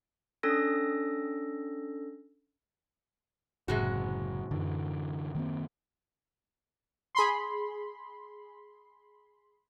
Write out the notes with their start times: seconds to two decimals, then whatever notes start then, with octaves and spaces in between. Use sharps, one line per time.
0.43 C#4 D4 A4 E6 A#6
3.68 F#1 A2 C3 G#3 F#4 G#4
4.51 F#2 D3 E3
5.35 D#3 A#3 C4
7.15 G#4 B5 C6